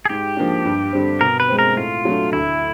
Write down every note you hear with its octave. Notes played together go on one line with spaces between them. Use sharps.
G#4
G#2 G4
F3 A#3 D4
G2
D3 G3 C4
B2 A#4
B4
G#3 C4
A#4
A2 F4
F#3 A3 D4
D2 E4